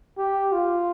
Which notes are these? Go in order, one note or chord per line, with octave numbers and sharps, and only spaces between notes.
G4
F4